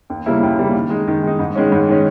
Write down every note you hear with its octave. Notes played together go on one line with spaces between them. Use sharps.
D#2
C#3 G3 A#3 E4
D#2
C#3 G3 A#3 E4
D#3
G#3 D#4
D#3
G#3 D#4
G#2
D#3 G#3 C#4
G#2
D#3 G#3 C#4